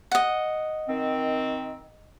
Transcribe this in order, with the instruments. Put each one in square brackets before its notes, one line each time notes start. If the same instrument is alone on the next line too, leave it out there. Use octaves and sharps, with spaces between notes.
[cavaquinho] D#5 F#5
[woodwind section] D#3 C4